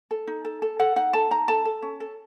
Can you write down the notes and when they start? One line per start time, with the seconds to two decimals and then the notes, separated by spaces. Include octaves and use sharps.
0.11 A4
0.27 D#4
0.45 A4
0.62 A4
0.79 A4 F#5
0.96 D#4 F#5
1.13 A4 A5
1.31 D#4 A#5
1.48 A4 A5
1.65 A4
1.82 C#4
2.00 A4